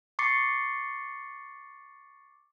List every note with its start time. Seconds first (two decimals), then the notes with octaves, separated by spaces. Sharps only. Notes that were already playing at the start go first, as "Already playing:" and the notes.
0.19 C#6 D6 A6 C7 C#7